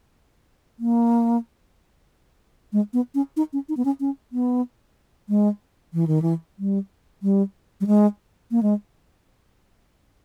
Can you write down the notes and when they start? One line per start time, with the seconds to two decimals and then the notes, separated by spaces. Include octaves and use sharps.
0.79 A#3
2.73 G#3
2.93 B3
3.15 C#4
3.37 D#4
3.53 C#4
3.69 D#4
3.77 B3
3.85 C#4
4.00 C#4
4.32 B3
5.29 G#3
5.94 E3
6.07 D#3
6.22 E3
6.59 G3
7.23 G3
7.81 G3
7.87 G#3
8.51 A#3
8.63 G#3